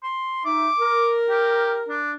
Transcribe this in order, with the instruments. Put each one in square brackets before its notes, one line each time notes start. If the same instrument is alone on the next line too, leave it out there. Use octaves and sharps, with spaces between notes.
[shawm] C6
[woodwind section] D#4 E5 [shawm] D6
[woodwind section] A#4
[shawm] G4
D4